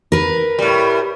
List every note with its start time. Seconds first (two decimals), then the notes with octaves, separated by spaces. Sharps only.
0.12 A#4 B4
0.59 A2 G3